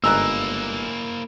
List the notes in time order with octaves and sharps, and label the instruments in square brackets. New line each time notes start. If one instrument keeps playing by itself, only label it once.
[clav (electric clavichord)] G1 A#4 [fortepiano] G#2 A#5 F#6 [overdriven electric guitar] A#3 E4 [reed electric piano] E6